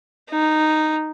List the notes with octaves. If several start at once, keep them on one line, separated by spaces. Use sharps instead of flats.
D#4